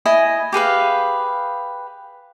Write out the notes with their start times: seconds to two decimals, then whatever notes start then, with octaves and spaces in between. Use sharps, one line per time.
0.05 E4 D#5 G#5
0.53 G4 G#4 B4 F5